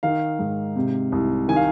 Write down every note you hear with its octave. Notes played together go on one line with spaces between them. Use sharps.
D#3 F5
G#2
C3
C2
D#3 G#5
F5